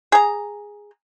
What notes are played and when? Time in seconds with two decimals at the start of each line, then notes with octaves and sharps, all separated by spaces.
0.12 G#4 A#5